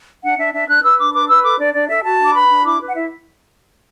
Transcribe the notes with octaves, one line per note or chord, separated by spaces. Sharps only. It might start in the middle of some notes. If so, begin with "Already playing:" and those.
D4 F#5
D4 E5
D4 E5
D4 F#6
B4 E6
D4 D6
B4 D6
B4 E6
A4 D6
D4 D5
D4 D5
A4 E5
F#4 A5
D4 D6
B4 B5
D4
E4 D6
B4
F#5
E4 E5